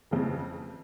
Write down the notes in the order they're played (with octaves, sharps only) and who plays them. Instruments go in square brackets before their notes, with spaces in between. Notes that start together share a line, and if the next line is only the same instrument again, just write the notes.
[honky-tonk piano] F2 C#3 E3